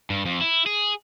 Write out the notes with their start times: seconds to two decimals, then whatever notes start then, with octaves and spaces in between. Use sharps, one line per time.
0.10 G2
0.25 F2
0.41 E4
0.66 G#4